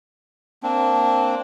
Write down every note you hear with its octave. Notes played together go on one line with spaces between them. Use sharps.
A#3 C4 D4